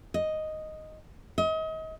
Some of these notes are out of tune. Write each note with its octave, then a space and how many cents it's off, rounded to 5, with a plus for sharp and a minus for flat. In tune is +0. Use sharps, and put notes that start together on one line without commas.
D#5 +0
D#5 +35